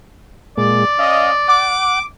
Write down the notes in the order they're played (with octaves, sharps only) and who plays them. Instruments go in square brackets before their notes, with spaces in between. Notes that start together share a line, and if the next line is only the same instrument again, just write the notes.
[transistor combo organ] A#2 G#3 [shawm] D5
[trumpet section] C#4 D#5 [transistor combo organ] F5
[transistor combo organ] F#5 [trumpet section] D6